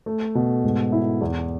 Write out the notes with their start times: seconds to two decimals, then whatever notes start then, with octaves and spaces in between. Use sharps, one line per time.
0.06 A3
0.35 B2
0.64 G#2
0.92 E4
1.21 E2